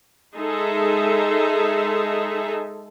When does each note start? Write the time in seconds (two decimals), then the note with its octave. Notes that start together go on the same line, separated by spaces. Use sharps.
0.36 G#3 D#4 G#4 A4 E5